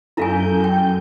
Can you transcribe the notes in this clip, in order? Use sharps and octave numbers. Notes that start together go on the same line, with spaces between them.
F#2 E4 A4 A#4 F5 G#5 D#6 G6
G5